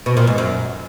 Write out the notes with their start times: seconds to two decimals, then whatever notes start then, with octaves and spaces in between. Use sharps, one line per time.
0.06 B2
0.17 A#2
0.27 G#2
0.38 F#2